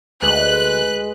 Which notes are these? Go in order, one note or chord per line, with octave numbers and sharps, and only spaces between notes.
D2 G#3 B4 F#6